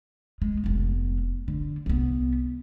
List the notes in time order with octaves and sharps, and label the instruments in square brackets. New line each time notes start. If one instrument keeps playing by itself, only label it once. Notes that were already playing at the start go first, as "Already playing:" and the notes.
[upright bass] G#3
F1 B3
D3
C2 B3